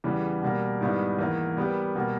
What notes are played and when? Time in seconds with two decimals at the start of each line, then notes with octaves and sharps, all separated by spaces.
0.04 E2 C#3 E3 G3
0.42 B2 G3 A#3
0.81 G#2 D#3 G3 B3 E4
1.19 E2 D#3 A#3 E4
1.57 G3 B3 G4 A#4
1.95 B2 G3 A#3